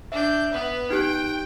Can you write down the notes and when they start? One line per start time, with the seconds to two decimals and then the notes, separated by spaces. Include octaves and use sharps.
0.12 D4 E5 G6
0.52 B3 B4
0.90 D#4 G4 G5 F#6